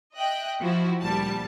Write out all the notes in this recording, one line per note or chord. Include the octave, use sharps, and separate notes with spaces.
D#5 E5 G5 F#6
F3 E4 F#4
D2 A#2 G3 A5